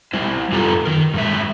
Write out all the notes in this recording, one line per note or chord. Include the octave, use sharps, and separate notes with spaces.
G3 E4 C5
F#2 B3 F4 G4 A4 A#5
D#3 A#4
G2 G#3 E5